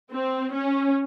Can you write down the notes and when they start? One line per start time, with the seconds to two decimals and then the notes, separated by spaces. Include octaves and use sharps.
0.11 C4
0.54 C#4